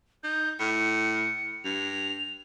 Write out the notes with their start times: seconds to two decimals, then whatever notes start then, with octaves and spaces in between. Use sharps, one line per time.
0.24 D#4 G6
0.59 A2 C#7
1.65 G2 F7